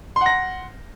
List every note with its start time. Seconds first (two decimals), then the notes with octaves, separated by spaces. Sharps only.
0.16 C6
0.21 F#5
0.26 A#6